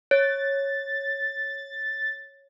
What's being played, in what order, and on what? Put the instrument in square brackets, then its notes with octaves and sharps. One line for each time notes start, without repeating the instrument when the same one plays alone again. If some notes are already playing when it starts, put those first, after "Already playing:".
[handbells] C#5 [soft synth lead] A6